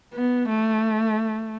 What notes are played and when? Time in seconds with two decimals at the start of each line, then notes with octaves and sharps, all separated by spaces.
0.14 B3
0.49 A3